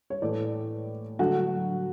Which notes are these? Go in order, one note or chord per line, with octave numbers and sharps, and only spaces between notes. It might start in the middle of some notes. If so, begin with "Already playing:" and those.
C#5
A2 E3 A3 D5
D3 F#3 A3 F#4